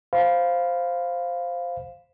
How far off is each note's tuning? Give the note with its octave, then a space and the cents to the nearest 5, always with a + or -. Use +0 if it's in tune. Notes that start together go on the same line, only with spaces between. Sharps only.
C5 +0 F5 +0 B5 +0